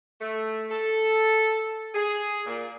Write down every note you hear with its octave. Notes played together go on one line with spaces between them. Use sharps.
A3
A4
G#4
A#2